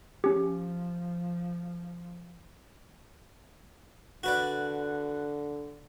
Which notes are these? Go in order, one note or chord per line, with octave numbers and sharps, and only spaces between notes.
F3 C#4 G4
D3 F#4 B4 D5